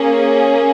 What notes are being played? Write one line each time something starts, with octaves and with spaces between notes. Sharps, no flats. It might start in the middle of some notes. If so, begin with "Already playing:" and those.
Already playing: A#3 C#4 G#4